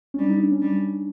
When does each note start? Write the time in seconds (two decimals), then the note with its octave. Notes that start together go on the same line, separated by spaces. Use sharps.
0.14 C#4
0.19 G3 D4
0.29 D#4
0.40 D4
0.51 C#4
0.62 G3